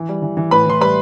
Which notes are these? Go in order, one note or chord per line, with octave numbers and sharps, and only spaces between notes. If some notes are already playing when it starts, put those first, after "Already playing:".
Already playing: E3
G3
E3
E3
A2 B4 B5
E3 C6
G3 B4 B5